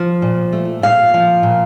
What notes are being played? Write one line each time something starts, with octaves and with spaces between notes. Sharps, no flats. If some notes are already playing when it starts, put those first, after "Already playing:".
Already playing: F3
A#2
A3
A#2 F5
F3
A#2